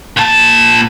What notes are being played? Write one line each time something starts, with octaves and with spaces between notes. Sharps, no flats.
A#2 A5